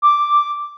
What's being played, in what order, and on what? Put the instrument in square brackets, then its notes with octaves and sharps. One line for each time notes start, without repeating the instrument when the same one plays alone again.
[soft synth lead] D6